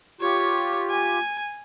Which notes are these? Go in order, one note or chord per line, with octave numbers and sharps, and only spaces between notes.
F4 G4 C#5
G#5